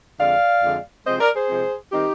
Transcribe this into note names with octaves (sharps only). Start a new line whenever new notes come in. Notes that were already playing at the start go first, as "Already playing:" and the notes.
F2 D3 G#3 D5 F5
F2 D3 G#3
C3 F3 G#3 C4 C5 D#5
A#4 D5
G#4 C5
C3 F3 G#3 C4
D#3 G3 C4 D#4 G4